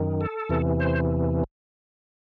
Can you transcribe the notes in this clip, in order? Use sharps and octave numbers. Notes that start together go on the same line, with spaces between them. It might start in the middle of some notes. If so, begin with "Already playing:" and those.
Already playing: F#2 D#3
A4
E2 C3 E3
C5